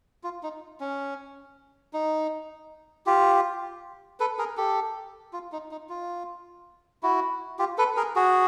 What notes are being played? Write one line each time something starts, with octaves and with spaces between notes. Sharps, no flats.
F4
D#4
C#4
D#4
F4 G4
A4 B4
G#4 A#4
G4 A4
F4
D#4
D#4
F4
E4 F#4
F4 G4
A4 B4
G#4 A#4
F#4 G#4